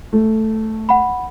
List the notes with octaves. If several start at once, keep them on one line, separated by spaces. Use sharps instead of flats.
A3
F#5 B5